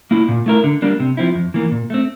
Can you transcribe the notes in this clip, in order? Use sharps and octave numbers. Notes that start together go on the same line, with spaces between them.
A#3 E4
A#2
A3 E4 A#4
D3
G3 A#3 D4
C3
F3 C4 E4
F2
E3 A#3
A#2
A3 C4